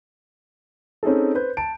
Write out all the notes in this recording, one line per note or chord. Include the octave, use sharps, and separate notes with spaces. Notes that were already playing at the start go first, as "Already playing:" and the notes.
C4 C#4 D#4 G#4 A4
B4 C5 G6
A5 D7